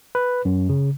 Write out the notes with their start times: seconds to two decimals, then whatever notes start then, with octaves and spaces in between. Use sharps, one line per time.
0.15 B4
0.45 F#2
0.69 C#3